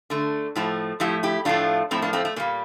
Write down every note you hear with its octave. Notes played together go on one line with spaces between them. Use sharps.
D3 A3
A2 F3 A3
A2 F3 A3 E4 G4
E4 G4
A2 F3 A3 D4 F4
A2 F3 A3 C4 E4
A#3 D4
A3 C4
A3
A#2 G3 A#3